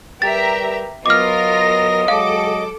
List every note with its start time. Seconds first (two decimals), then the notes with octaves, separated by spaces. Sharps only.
0.22 G3 G4 A#4 B4 E5 A#5 A6
1.06 F#3 B3 F4 A#4 D#5 D6 F6 A#6
2.08 F#3 G#3 A4 F5 D6